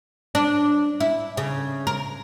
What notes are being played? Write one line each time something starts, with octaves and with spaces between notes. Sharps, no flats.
D4
E4
C#3
A#4